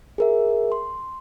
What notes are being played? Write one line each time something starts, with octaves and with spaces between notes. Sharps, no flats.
G#4 A#4 E5
C6